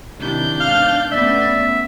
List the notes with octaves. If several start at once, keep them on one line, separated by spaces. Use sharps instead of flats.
C3 D#3 D4 E4 G6
G#2 B2 F5 F6
A3 B3 C#4 D5 E5